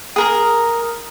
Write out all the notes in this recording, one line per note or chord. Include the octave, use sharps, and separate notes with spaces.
G#4 A#4 A#5